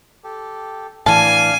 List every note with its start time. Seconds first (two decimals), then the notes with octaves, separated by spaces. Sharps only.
0.24 G4 A4
1.06 A2 E3 D4 F5 G#5 A5 F6